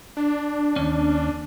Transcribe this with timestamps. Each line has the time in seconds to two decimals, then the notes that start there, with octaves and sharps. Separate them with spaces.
0.17 D4
0.76 D#2 C#4